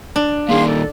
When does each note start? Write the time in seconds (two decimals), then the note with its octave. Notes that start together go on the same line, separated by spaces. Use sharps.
0.16 D4
0.49 A#2 D#3 G#4 F5 C6
0.67 A4